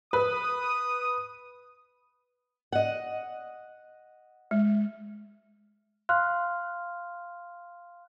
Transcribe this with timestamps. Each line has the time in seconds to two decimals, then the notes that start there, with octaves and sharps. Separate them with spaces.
0.13 B4 D#6
2.72 D#5 F#5
4.51 G#3
6.09 F5 C6 F6 F#6